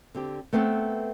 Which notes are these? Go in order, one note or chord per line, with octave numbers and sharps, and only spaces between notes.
D3 C4 G4
A3 B3 C4 A4 B4